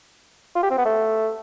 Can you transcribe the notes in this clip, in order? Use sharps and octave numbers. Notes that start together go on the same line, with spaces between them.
F4
G4
C4
B3
A3